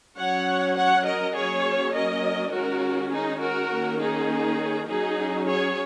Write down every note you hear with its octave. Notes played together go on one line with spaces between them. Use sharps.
F#3 C#4 C#5 F#5
C#5 F#5
A#4 D#5
F#3 A#3 C#4 G#4 C#5
A#4 D#5
D#3 G#3 C#4 F#4 A#4
D#4 G#4
F#4 A#4
D#3 A#3 C#4
D#4 G#4
F#3 C#4 D#4 G#4
G#4 C#5